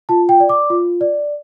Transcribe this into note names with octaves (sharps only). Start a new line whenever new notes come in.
F4 A5
G5
D5
D6
F4
D5